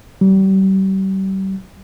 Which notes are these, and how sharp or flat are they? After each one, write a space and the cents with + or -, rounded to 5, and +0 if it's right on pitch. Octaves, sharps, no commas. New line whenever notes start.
G3 -35